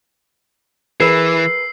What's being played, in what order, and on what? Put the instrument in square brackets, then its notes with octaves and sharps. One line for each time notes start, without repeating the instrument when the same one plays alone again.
[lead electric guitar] E3 [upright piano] G#4 A#4 B4 [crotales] E6 C7